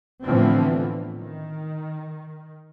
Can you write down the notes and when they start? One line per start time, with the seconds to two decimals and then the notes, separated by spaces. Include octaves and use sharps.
0.24 A2 D3 E3 F3 B3 C4
1.18 D#3